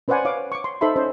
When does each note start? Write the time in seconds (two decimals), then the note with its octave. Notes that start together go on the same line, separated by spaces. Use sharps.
0.08 C#4 B4 C5 D5 F#5 G#5
0.25 C#5 F5 D6
0.52 C#6 D6
0.64 C6
0.81 D#4 A4 C5 E5 B5 C6
0.96 C#4 C5 D#5